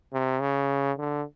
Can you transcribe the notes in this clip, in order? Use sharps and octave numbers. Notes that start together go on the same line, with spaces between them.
C3
C#3
D3